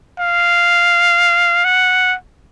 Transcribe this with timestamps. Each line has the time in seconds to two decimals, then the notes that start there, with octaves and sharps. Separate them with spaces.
0.19 F5
1.65 F#5